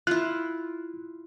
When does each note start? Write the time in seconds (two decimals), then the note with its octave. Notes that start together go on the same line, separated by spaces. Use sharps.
0.07 E4 F4 F#6